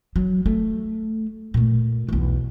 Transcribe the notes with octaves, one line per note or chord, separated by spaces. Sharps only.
F#3
A3
A#2 A3
B1 E2